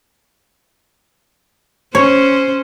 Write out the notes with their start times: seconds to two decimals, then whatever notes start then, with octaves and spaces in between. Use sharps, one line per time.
1.95 C#4 C5 C#5